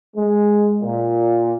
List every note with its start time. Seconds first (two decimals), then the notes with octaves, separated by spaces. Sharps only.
0.16 G#3
0.81 A#2